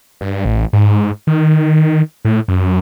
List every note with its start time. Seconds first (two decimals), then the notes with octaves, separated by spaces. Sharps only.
0.21 G2
0.45 A1
0.73 G#2
1.27 D#3
2.25 A2
2.48 F#2